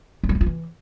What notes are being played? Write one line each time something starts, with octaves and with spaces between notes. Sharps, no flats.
G#3
G3
A#3
F4
E3